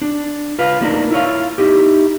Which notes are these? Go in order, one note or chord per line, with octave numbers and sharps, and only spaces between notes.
D4
F4 B4 F5
A3 A#3 D4 D#4 A#4
E4 F4 C#5 F5
D#4 E4 G4